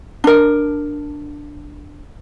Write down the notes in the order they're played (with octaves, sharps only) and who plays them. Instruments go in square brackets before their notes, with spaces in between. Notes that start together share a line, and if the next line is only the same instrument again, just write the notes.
[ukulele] D4 A#4